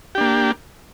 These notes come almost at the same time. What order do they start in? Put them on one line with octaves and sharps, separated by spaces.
G4 D4 A#3